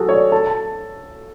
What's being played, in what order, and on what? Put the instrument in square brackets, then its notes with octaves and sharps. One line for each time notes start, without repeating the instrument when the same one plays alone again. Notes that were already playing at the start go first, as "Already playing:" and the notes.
Already playing: [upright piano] F#3 F#4 [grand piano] G#4 A4
[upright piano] C#5
[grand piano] D5
[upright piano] A4 [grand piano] A5
[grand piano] A5